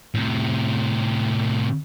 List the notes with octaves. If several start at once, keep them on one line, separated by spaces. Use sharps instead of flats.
A2 C3